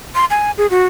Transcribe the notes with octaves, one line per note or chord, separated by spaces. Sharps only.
C6
G#5
G#4
F#4